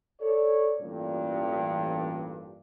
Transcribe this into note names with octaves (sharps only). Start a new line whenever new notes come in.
A4 C#5 D5
A1 G2 A#2